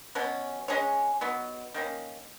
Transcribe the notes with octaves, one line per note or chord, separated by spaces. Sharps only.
B2 F#3 C#4
G#3 C#4 G#4 C#5
F#3 B3 D#4
D#3 A#3 C#4